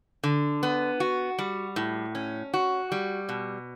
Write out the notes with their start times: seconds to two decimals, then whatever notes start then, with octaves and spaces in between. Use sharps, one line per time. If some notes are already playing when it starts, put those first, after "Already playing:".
0.24 D3
0.63 B3
1.00 F#4
1.39 G3
1.76 A2
2.15 C#4
2.54 F#4
2.92 G3
3.29 B2